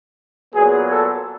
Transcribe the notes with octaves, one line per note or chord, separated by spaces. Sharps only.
A#2 F#3 B3 G#4
A4